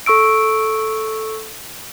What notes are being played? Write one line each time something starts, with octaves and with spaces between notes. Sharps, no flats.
A4 C#6 E6 D7